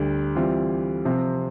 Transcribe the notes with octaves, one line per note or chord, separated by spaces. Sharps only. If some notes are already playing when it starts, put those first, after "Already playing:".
Already playing: D2 D3 G3
E3 G3 C4 F4
C3 F3 C4